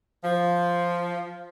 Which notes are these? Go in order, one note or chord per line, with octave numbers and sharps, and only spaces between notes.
F3